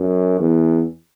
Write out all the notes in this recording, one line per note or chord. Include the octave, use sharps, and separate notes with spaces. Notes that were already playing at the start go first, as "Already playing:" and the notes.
Already playing: F#2
E2